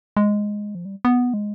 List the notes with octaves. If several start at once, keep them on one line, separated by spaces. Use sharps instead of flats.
G#3
F3
G3
B3
G#3